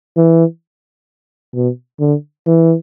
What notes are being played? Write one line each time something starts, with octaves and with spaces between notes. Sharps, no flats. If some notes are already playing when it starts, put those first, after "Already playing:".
E3
B2
D3
E3